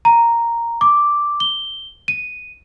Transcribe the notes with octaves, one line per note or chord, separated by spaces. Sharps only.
A#5
D6
G7
D#7